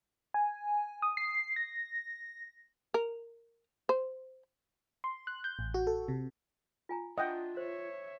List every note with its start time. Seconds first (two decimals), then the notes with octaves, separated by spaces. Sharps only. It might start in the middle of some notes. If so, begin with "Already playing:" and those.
0.34 G#5
1.02 D#6
1.17 C7
1.56 A#6
2.94 A#4
3.89 C5
5.04 C6
5.27 F#6
5.44 G6
5.59 A1
5.74 F#4
5.87 A4
6.08 C3
6.89 F4 G#5 A#5
7.18 D4 F4 D#5 E5 F#5 G5
7.57 C5 C#5 E5